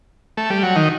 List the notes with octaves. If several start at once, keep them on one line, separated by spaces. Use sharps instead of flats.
A3
G3
F#3
D#3